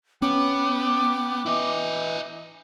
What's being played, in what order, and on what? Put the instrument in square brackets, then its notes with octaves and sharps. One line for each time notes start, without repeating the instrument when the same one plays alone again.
[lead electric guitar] B3 [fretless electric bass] C#4 [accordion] G5 [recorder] D6
[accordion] E3 [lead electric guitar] E4 D#5